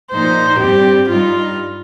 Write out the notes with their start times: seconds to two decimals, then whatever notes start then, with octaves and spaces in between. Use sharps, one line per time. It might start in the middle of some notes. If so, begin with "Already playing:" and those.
0.11 A#2 F3 D#4 C5
0.59 G2 G3 C4 G4
1.10 G2 G3 D#4 F4